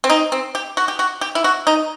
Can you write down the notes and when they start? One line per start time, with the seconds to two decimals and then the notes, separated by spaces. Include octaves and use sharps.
0.04 C4
0.10 D#4
0.32 C4
0.55 G4
0.77 F#4
0.88 G4
0.99 F#4
1.21 G4
1.35 E4
1.44 F#4
1.67 D#4